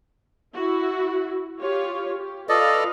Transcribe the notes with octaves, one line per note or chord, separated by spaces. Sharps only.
E4 F#4
F4 G4 C#5
G4
F4 A4 B4 D5 D#5 F5